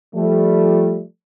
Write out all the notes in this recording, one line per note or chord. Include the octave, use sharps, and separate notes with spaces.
F3 G3 A3